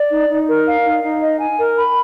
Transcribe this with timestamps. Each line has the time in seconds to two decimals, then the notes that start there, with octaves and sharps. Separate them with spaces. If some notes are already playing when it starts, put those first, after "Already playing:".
Already playing: D5
0.11 D#4
0.30 D#4
0.48 A#4
0.67 F5
0.85 D#4
1.04 D#4
1.22 D#5
1.40 G#5
1.59 A#4
1.78 B5